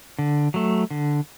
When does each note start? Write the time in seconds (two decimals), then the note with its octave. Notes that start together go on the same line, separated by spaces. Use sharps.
0.19 D3
0.54 F#3 A3
0.91 D3